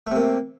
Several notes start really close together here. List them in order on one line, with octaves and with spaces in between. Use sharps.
A3 C3 A#3